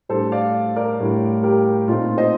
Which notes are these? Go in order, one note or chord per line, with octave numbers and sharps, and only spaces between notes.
A2 G3 D4 A4 C5
D5 F5
A#4 D5
A2 G3 D4
G4 A#4
A#2 A3 C4 D#4 F4
C5 D#5